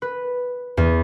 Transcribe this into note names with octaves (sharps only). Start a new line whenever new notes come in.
B4
E2